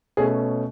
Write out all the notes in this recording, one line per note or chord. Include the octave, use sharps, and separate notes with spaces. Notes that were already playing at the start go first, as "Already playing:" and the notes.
B2 A3 C#4 G#4